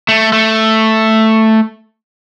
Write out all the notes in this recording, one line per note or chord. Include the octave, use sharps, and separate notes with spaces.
A3
A3